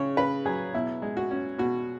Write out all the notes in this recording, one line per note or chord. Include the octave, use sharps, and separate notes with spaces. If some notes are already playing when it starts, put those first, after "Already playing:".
Already playing: C#3 C#5
C#3 B4
F#3 G#4
B2 E4
G#3
F#4
C#4
B2 F#4